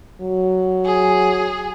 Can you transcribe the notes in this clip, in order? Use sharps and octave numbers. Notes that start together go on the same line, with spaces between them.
F#3
G#4